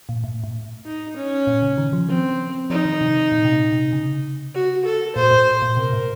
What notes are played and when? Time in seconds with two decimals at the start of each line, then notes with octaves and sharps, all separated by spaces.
0.09 A#2
0.24 A2
0.44 A2
0.85 D#4
1.16 C#4
1.47 A#2
1.62 C#3
1.78 D#3
1.93 F3
2.08 F3 C4
2.70 F3 D#4
2.85 D#3
3.01 C3
3.32 A#2
3.45 C3
3.52 A#2
3.72 C3
3.93 C#3
4.54 F#4
4.85 A4
5.15 A#2 C5
5.31 A2
5.62 A#2
5.77 C3 A#4
5.93 A2